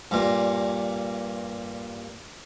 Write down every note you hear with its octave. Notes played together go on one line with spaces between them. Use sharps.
G2 A#2